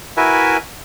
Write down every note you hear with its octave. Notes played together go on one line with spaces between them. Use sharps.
E4 F#4 A#4 B4 E5 G#5